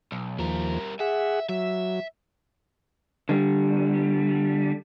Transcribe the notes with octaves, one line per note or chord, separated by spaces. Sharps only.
B1
D#2 F3 G3 A#4
G#4 E5 F#5
F#3 E5
D3 G3